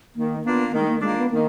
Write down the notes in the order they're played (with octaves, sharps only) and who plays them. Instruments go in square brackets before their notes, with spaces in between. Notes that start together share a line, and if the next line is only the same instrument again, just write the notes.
[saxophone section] D#3 [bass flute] A#3
[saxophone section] A#3 D4 F4 [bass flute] B3
[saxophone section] D#3 [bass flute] A#3
[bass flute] G#3
A#3
[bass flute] G#3 [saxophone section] A#3 D4 F4
[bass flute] B3
[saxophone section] D#3 [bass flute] A#3